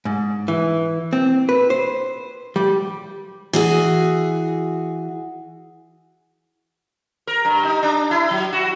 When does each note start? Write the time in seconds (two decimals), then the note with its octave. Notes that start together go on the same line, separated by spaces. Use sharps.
0.05 G#2
0.48 E3
1.13 C4
1.49 B4
1.70 C5
2.56 G3
3.53 E3 F#4 G#4
7.27 A#4
7.45 G2
7.64 D#4
7.83 D4
8.11 E4
8.31 F#3
8.53 F#4